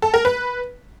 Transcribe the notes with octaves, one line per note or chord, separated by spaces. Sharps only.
A4
A#4
B4